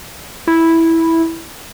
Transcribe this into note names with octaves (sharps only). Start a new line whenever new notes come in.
E4